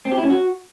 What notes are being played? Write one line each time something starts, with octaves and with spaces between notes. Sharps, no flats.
C4
G4
E4
C#4
F#4